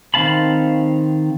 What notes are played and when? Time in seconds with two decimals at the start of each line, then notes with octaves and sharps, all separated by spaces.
0.14 D#3 C4 F5 A5 B5